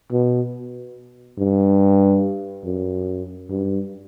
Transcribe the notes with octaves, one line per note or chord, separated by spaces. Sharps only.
B2
G2
F#2
G2